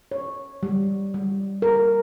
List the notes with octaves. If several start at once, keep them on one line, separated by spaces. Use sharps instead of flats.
C#5
G3
G3
A#4